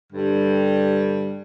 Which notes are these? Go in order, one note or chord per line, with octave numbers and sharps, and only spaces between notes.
G2 D3 G3